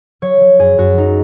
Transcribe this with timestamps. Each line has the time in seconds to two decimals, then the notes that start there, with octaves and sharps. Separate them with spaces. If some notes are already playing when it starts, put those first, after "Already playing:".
0.22 F#3 C#5
0.41 F#3
0.59 F#2 G#4
0.78 F#2 F#4
0.97 F#3 D#4